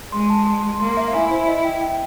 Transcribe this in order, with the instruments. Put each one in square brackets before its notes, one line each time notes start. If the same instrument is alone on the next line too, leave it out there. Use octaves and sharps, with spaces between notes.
[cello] G#3 [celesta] C6
[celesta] A5
C6
C6
[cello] A#3 [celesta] C6
[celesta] E5
[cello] E4 [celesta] G#5
[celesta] C5
D#5
G5
G5